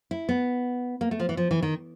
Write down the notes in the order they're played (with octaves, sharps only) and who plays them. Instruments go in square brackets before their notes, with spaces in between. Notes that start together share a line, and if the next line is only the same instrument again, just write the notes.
[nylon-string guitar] E4
B3
A#3
A3
F3
E3
F3
E3
D#3